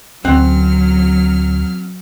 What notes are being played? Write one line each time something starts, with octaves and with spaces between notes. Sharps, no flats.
D2 F#3 C4 C#4 F#5 F6